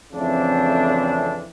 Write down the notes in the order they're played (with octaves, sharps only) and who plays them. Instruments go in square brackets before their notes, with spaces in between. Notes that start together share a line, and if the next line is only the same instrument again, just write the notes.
[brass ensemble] F2 C#3 E3 A3 C4 D4